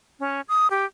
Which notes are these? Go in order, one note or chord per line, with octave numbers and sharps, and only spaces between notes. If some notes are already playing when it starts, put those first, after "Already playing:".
C#4
D#6
G4